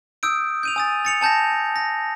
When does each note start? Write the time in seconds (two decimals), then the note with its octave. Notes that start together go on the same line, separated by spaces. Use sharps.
0.23 D#6 E6 G6 D7
0.63 G6 D#7 F7
0.76 G#5 D#6 A6
1.05 A6 C#7 F7
1.21 G#5 A5 G6 A6 A#6
1.76 A#6